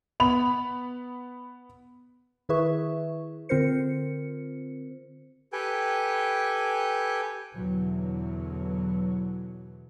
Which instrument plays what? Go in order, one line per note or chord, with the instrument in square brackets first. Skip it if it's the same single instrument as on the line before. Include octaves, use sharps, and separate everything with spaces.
[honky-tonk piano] B3 B5 F7
[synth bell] D#3 E4 G#4 B4 E5 C#6
D3 C4 F4 A#4 C5 C#7
[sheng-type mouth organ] G4 A4 B4 G5 G#5
[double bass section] E2 B2 D3 E3 F#3